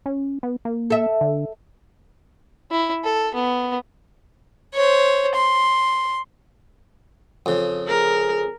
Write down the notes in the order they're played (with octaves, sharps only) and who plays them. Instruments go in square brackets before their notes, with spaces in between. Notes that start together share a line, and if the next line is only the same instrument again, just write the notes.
[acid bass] C#4
B3
A#3
[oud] A4 E5
[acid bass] D3
[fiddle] E4
A4
B3
[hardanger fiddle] C5 C#5
C6
[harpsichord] F2 C#3
[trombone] G#4 [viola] A#4